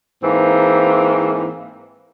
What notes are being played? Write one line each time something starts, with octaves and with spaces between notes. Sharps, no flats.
G#2 E3 A#3 C4